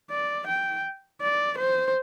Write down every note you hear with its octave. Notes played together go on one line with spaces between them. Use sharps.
D5
G5
D5
C5